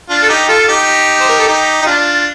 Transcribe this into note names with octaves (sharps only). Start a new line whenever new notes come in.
D4 F4
A4
D#4 G4
F4 A4
D#4 G4
C5
A#4
A4
D#4 G4
D#4
D4 F4